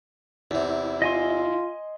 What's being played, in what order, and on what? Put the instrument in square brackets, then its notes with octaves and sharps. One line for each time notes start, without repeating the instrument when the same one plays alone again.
[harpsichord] E2 C3 [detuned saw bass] E4
[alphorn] F4 [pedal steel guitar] D#5 G#5 C6